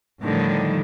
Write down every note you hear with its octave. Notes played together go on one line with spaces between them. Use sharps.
A2 D3 D#3 F3 G3